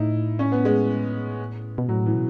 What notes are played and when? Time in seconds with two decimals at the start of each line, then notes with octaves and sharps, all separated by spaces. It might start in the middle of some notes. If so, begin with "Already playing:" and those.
Already playing: A2 D#4 E4
0.39 C#4
0.52 B3
0.65 G#3
1.78 B2
1.89 A2 F#3
2.06 E3
2.15 B2